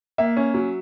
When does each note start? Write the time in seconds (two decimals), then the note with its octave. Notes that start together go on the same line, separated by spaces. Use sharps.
0.18 A#3 E5
0.37 C#4
0.54 F#3